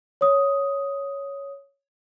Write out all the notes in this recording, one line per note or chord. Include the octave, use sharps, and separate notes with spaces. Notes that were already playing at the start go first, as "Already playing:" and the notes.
C#5 D#6